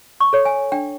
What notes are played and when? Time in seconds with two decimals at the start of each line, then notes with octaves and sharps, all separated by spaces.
0.20 C#6
0.33 A4 C#5
0.45 G#5
0.72 D4 G5